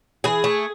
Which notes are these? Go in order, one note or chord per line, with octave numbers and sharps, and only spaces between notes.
E3 G#4
A3